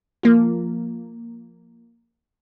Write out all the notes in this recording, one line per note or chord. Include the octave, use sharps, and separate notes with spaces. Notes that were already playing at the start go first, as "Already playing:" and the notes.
F3 A#3 F4